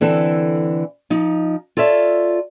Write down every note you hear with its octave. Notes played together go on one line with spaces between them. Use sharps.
D3 E3 C4 A4
F3 D#4
F4 A4 C#5 D5 E5